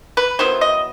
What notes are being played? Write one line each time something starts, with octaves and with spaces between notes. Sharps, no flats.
B4
D#3 F#3 B3 E4 C5
D#5